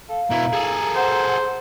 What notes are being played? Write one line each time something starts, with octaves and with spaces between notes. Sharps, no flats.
A4 F5
B2 E4 A#4
G#4 A4
C5 F#5